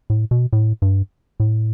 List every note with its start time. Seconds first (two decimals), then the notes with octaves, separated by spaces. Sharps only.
0.10 A2
0.31 B2
0.53 A2
0.82 G2
1.40 A2